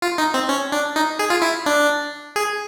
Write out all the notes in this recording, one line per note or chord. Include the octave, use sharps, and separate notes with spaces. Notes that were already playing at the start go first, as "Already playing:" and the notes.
F4
D#4
C4
C#4
D4
D#4
G#4
F4
E4
D4
G#4